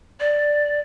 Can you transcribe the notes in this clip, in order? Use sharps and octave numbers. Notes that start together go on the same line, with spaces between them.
D5